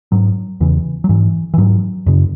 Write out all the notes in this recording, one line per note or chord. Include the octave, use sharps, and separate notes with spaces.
G#2 F#3
E2 C#3 E3
F#3
G#2 E3
E3
G#2 F#3
F#2 C#3